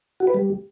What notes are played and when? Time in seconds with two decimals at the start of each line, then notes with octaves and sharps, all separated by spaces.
0.20 F#4
0.27 B4
0.34 G3